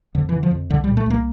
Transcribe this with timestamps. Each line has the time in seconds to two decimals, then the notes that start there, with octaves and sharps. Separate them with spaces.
0.15 F2 D3
0.29 E3
0.33 D3
0.43 F3
0.51 F2
0.70 C2 D3
0.84 G3
0.88 A#2
0.97 A3
1.06 C2 A#3